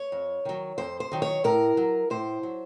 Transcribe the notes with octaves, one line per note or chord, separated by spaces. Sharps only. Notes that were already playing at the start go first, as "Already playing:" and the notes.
Already playing: C#5
F2
D#3 F#3
F2 C5
C5
D#3 F#3
C#5
A2 A#4
F#3
A2 C5
F#3